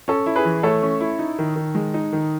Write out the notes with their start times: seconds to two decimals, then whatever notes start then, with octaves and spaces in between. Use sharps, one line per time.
0.08 C#4 A4
0.26 E4
0.36 G#4 B4
0.45 E3
0.63 A3 A4 C#5
0.82 C#4
1.01 E4
1.19 D#4
1.39 D#3
1.56 D#3
1.75 G#3
1.94 D#4
2.13 D#3